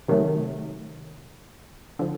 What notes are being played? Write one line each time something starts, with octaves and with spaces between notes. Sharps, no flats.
C3 D#3 F#3 A3
D3 F3